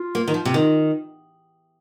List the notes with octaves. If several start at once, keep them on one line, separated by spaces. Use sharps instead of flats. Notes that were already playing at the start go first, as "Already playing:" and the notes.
Already playing: F4
A#3
D#3
F3
C3
D#3